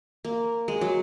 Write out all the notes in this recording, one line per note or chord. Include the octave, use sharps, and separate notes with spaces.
A#3
G#3
F#3